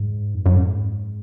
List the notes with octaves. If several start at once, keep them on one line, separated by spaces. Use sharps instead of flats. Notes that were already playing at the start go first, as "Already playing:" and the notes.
Already playing: G#2
F2
F#2
G#2